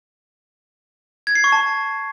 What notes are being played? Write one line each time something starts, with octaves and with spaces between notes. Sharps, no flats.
G#6
C7
C#6
A5